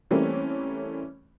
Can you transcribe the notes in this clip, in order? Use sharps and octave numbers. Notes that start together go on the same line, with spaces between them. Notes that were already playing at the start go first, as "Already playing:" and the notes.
E3 G3 A3 A#3 C4 C#4